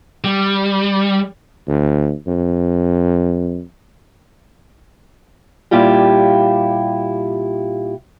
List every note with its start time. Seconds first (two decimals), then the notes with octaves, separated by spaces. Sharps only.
0.24 G3
1.68 D2
2.27 F2
5.71 A#2 G3 E4 F4 G4